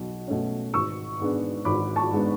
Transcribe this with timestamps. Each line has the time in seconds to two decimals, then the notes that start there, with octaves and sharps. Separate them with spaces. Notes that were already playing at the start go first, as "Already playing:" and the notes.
Already playing: B1 B2
0.28 B2 A3 C#4
0.74 G#1 C#6 E6
1.20 G#2 G#3 B3 D4
1.65 G#1 B5 D6
1.96 A5 C#6
2.11 G#2 G#3 B3 D4